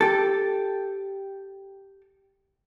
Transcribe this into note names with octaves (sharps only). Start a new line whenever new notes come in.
G4 A4